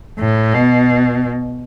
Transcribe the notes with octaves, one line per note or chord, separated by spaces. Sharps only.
A2
B2